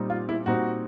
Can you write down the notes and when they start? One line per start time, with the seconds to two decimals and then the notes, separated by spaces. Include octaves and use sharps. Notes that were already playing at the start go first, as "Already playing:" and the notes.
Already playing: A#2 G3 C4 D#4
0.10 F4
0.29 E4
0.46 A#2 G3 C4 D#4 F#4